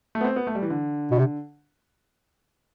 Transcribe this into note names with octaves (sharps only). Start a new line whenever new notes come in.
A3
B3
C4
B3
A3
G3
E3
D3
B2
C3